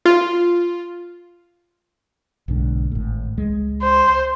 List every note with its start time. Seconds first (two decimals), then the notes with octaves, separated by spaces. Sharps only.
0.05 F4
2.48 B1 G#2 D3
2.92 G#1 A2
3.37 C#2 G#3
3.82 C5